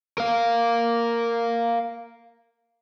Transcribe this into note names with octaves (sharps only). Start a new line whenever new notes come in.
A#4 F5